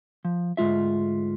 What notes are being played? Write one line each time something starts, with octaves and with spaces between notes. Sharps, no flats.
F3
D2 G#2 G#3 F4 E5